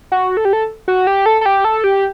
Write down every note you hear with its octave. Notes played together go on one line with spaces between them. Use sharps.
F#4
A4
G4
A4
F#4
G4
A4
A4
G4
A4
G4